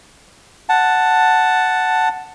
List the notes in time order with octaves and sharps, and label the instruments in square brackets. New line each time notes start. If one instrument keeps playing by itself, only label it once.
[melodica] F#5 A5